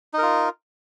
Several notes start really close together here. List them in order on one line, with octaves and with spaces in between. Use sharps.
D#4 A#4 F4